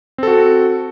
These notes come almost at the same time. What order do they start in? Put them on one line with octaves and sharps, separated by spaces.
C4 A4 F#4